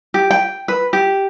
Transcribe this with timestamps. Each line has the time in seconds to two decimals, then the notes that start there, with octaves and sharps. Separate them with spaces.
0.14 G4
0.31 G5
0.68 B4
0.93 G4